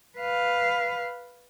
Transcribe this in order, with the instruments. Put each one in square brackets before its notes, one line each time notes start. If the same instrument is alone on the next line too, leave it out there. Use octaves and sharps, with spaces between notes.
[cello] B4 F5